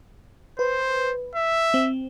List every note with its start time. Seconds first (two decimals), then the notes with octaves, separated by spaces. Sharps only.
0.59 B4 C5
1.35 E5
1.74 C4